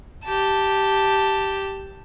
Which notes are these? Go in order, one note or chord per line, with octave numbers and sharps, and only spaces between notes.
G4 A5